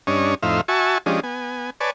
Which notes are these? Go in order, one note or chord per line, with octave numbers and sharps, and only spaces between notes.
G2 C#4 D4 C#5 D#5
F2 A2 D#4 C5 E5 F5
F#4 E5 G#5 A5 C#6
F3 G#3 C#4 D4 G4 D#5
B3 G#5
B4 C#5 D5 G#5 A5